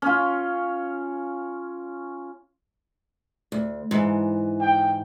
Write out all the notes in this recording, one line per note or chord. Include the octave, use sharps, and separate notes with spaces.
C#4 F4
D2
G#2 E3
G5